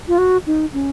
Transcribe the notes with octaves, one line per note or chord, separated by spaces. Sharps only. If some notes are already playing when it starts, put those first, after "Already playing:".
F4
F#4
D#4
C#4